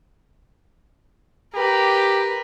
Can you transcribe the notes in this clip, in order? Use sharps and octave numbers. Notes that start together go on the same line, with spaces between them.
G4 A#4 B4